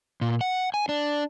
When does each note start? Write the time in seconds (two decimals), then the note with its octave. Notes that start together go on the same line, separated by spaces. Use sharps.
0.21 A#2
0.41 F#5
0.74 G#5
0.89 D4